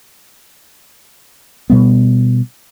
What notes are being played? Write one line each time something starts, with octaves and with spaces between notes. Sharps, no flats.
B2 G3 B3